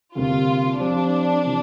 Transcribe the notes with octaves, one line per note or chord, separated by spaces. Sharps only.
D2 C3 G3 A#3 F4
F3 C4 D4 G4 C5
C3 E3 G3 A#3